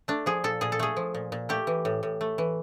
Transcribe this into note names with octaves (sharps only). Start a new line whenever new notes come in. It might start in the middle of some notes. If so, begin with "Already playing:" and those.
A3 D4
F3 G#4
A#2 A4
A#2 G#4
A4
A3 G#4
F3
A#2
A#2
A3 G4
E3
A2
A2
A3
E3